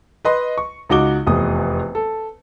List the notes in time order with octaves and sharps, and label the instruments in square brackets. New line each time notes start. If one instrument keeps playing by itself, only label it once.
[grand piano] B4 D#5 C6
C#6
C#2 D#4 F#4 D6 G7
F1 E2 D#6
A4